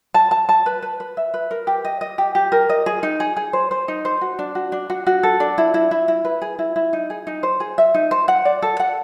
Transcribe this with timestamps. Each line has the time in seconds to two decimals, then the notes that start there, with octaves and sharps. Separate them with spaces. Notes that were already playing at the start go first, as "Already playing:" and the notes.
0.14 A5
0.31 A5
0.49 A5
0.66 B4
0.82 B4
1.00 B4
1.17 E5
1.34 B4
1.51 A#4
1.67 G4
1.85 D#5
2.01 D#5
2.18 G4
2.35 G4
2.52 A#4
2.69 D#5
2.86 G#4
3.03 D#4
3.20 G#4
3.36 G#4
3.53 C5
3.71 C5
3.88 D#4
4.05 C5
4.21 F#4
4.39 D4
4.55 F#4
4.72 D4
4.90 F#4
5.07 F#4
5.23 A4
5.40 D4
5.58 E4
5.74 E4
5.91 E4
6.08 E4
6.25 B4
6.41 G#4
6.59 E4
6.76 E4
6.93 D#4
7.10 G#4
7.27 D#4
7.43 C5
7.60 G#4
7.78 E5
7.94 D#4
8.11 C5
8.28 F#5
8.45 D5
8.62 A4
8.79 F#5